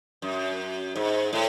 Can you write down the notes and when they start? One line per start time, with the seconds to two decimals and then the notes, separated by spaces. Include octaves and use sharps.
0.22 F#2
0.96 G#2
1.33 A2